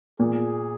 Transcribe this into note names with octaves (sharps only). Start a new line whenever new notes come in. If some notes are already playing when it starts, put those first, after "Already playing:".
A#2 G#4